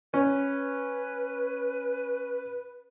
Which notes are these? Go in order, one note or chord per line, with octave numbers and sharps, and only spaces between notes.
C#4 B4